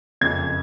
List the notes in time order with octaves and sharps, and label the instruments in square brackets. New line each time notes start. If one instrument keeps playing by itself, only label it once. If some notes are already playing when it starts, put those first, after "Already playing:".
[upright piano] F#1 F2 C#3 G#6